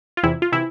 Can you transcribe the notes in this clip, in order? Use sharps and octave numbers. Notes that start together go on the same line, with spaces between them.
F4
E2 C3 E3 E4
F4
C3 E3 E4